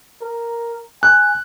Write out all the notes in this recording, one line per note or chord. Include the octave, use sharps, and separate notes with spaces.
A#4
G#5 F#6